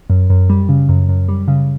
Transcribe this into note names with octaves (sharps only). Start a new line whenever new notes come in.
F#2
F#2
G3
C#3
F#2
F#2
G3
C#3